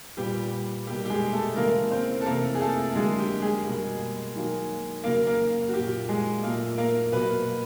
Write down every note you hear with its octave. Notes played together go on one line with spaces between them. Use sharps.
A#2 G3 B3 G4
B2 G3 A#3 G4
G4
G#3 G#4
A3 A4
C#3 E3 G#3 A#3 A#4
C4 C5
A4
C3 E3 A3 A#3 A#4
G#4
A3 A4
D3 F#3 G#3 A#3 G#4
G4
G#3 G#4
B2 G3 A#3
D#3 F#3 A#3
C#3 F#3 A#3 A#4
A#3 A#4
F#4
A#2 F#3 A#3 G4
G#3 G#4
A#2 F#3 A3 A#3 A#4
A#3 A#4
B2 F#3 A#3 B3 B4